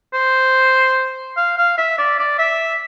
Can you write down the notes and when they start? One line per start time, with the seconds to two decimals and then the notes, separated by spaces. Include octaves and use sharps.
0.14 C5
1.37 F5
1.58 F5
1.78 E5
1.99 D5
2.19 D5
2.39 E5